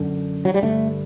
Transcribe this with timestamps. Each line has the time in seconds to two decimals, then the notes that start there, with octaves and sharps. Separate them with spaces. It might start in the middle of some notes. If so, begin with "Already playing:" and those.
Already playing: F#2 D3
0.45 F#3
0.54 G3
0.62 G2 D3 A3